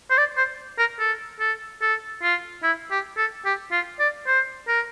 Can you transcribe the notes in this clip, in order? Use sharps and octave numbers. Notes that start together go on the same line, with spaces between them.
C5
D5
C5
A#4
A4
A4
A4
F4
E4
G4
A4
G4
F4
D5
C5
A#4